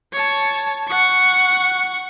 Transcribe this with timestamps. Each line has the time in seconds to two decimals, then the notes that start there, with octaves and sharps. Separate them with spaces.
0.13 C#5 A5
0.88 F#5 C#6